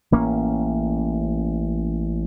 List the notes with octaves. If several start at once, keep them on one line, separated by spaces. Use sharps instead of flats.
A1 A#3 C#4